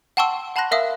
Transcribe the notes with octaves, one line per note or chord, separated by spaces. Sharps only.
F#5 G5 A5 C6 C#6 E6
F#5 A5 B5 C6 F#6 A#6
A#4 E5 F5 D#6 E6